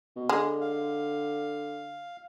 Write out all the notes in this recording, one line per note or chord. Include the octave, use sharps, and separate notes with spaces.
B2
D3 G#3
F5